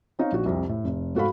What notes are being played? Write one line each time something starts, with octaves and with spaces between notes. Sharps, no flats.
C4 D#4 C#5 F5
A#1 F#4
C2 F2 C3
A2
F1
G#2 F#4 A4 F5 B5